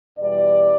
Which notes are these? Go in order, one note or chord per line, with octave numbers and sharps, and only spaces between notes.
E2 B2 G3 D5